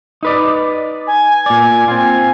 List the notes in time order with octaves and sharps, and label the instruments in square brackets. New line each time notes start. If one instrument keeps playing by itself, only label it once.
[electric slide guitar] D#4 B4 D5
[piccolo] G#5
[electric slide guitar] A#2 D5
[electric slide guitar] C4 F4 [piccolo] G#5